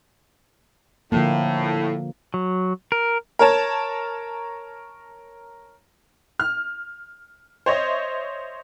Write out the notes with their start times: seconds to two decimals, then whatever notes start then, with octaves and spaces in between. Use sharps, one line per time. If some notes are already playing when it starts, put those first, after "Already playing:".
1.12 A2 D3 F3 A#3
2.34 F#3
2.92 A#4
3.39 A#4 C#5 A5
6.40 F6
7.66 C5 C#5 D#5 E5